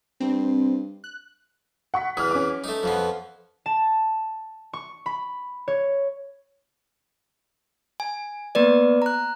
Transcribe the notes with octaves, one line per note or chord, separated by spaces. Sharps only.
G2 C4
F#6
F#5 C#6 B6
E2 E3 D#6 F6
C#4 B4 D6
A3 D#4
F2 F3 B3
A5
C#6
B5
C#5
G#5
A#3 B3 B4 D5
A#5 F#6